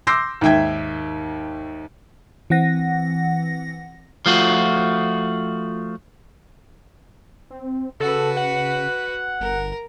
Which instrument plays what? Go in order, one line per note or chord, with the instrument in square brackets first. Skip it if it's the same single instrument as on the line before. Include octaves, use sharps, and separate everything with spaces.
[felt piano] C6 D6 E6 G6 A#6 C7
D#2 G#2 E5 G5 G#6
[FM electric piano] E3 C4 F#5 A#6
[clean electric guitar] F3 A3 F4 F#4
[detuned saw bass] C4
[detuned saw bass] C#3 [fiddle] F#4 B4 [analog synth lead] A4
[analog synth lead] F#5
[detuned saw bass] G1 [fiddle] A#4